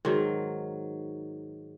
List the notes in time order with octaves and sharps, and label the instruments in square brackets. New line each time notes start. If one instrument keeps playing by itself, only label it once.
[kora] G#2 D#3 F#3